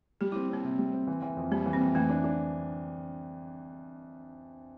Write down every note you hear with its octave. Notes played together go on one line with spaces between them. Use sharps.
G3 G4
E4
C4
A#3 C4
C3
G3
C4
E3
E3
F2
G3 A#3
E3
C4
F2
E3 A3
D4
D4